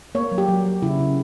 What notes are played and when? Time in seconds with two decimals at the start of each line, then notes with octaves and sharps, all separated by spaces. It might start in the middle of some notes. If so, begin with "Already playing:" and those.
0.15 A#3 C#5
0.32 F#3
0.38 G4
0.48 F#3
0.66 F#3
0.82 C#3 E4
0.99 C#3